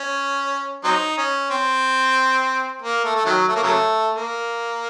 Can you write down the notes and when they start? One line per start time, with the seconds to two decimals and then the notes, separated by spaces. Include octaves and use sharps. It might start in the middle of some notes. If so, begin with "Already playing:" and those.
Already playing: C#4
0.84 F#3 C4 D#4
1.17 C#4
1.50 C4
2.82 A#3
3.04 A3
3.16 A3
3.26 D#3 F#3
3.48 A3
3.56 A#3
3.63 C#3 F#3 A3
4.14 A#3